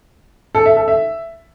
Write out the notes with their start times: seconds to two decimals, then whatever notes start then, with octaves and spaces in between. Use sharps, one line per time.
0.55 A4
0.66 E5
0.77 A4
0.88 E5